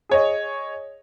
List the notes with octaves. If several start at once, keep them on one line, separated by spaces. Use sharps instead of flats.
G#4 C#5 D#5